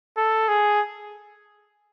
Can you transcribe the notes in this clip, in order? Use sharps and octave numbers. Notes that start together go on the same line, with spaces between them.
A4
G#4